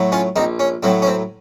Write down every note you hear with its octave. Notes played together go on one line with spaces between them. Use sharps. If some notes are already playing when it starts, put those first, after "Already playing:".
Already playing: A2 F#3
C#4 F4
A#1 C4 D#4
C#4
A2 F#3 C4
C#4
C4